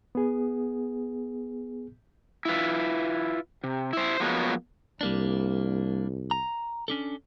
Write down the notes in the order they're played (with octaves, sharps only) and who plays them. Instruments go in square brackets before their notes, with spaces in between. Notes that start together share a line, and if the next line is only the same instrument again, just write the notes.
[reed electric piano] B3 G#4
[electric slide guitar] E4 F4 B4
C3
E4 C5
F3 F#3 G#3 A#3 B3 F#4
[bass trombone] C2 [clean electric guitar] G3 A#3 D4
[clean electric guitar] A#5
C#4 D4 A4